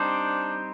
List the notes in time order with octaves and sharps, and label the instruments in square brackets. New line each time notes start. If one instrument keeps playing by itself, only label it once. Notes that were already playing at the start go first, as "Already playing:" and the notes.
Already playing: [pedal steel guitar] G3 C4 D#4 G4 C5 [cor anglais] D4